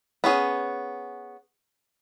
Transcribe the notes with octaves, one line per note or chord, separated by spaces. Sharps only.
B3 C#4 G#4